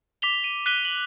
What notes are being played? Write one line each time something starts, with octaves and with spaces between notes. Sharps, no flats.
D6 B6 F7 G7
D#7
F#6 B6 D#7 G7
F#7